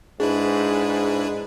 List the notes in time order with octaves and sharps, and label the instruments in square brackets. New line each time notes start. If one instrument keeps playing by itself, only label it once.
[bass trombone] G#2 [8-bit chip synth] D4 E4 B4 [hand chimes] G#4